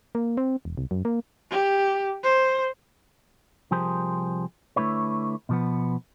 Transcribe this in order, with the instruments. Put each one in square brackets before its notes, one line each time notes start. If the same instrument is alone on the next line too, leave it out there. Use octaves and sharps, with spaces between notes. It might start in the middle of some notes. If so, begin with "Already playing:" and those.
[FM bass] A#3
C4
E1
C2
F#2
A#3
[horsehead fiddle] G4
C5
[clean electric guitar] C2 F3 G4 G#4 A#4 C5
D3 A3 E4 B4 C#5
B2 F3 B3